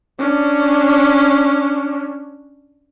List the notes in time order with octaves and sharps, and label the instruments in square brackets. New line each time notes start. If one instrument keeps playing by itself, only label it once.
[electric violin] C#4 D4